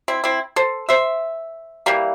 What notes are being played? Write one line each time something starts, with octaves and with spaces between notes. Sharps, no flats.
C4 E4
C4 E4
A4 C5
C5 E5
E3 G3 A#3